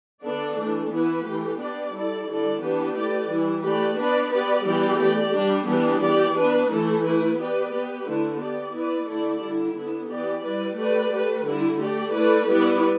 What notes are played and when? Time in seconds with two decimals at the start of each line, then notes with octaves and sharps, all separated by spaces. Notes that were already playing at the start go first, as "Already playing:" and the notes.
0.23 D3 B3 D4 A4 D5
0.57 E3 A3 D4
0.91 E3 B3 E4 B4
1.26 E3 A3 G4
1.59 B3 D4 G4 D5
1.93 G3 E4 A4 D5
2.27 D3 G3 E4 A4 D5
2.61 E3 B3 D4 G4 B4
2.95 A3 E4 G4 B4 D5
3.29 E3 G3 E4
3.64 A3 G4 B4 D5
3.97 B3 D4 B4 D5
4.31 B3 G4 B4 D5
4.65 E3 G3 B3 G4 D5
4.99 A3 G4 D5
5.33 G3 D4 G4
5.67 E3 G3 B3 D4 G4
6.01 E3 B3 G4 D5
6.35 B3 D4 B4
6.69 E3 A3 E4 A4
7.03 A3 E4 B4
7.37 B3 G4 B4 D5
7.71 B3 G4 B4
8.05 D3 A3 E4
8.40 B3 G4 D5
8.74 B3 E4 B4 D5
9.07 D3 A3 E4 A4 D5
9.41 D3 G3 E4
9.75 D3 B3 E4
10.09 E3 B3 G4 D5
10.44 G3 E4 B4 D5
10.77 A3 G4 B4 D5
11.11 A3 G4 B4
11.45 D3 G3 E4
11.79 A3 G4 D5
12.13 A3 E4 B4 D5
12.47 G3 B3 E4 B4 D5